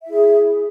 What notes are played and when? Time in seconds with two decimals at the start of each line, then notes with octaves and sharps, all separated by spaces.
0.02 E5
0.06 E4
0.11 G#4